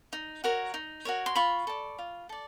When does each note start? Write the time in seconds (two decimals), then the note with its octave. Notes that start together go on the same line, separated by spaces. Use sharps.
0.13 D#4
0.44 F#4 A#4 C#5
0.74 D#4
1.05 F#4 A#4 C#5
1.26 C6
1.35 F4 B5 C#6
1.67 A4 D5
1.99 F4
2.29 A4 D5